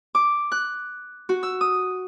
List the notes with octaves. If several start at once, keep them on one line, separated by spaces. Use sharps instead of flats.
D6
F#6
F#4
E6
D#6